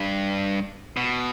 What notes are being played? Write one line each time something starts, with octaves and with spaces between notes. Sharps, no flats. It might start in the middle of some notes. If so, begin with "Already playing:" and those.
Already playing: G2
B2